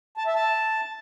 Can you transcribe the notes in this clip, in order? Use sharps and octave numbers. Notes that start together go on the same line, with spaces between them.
A5
E5
A5